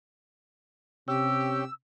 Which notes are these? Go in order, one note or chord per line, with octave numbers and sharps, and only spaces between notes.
C3 C#4 G4 C#5 G5 E6